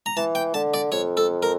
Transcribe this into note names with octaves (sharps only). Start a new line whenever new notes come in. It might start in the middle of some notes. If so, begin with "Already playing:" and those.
A#5
E3 A5
G5
D3 A5
D5
F2 C#5
A4
A#4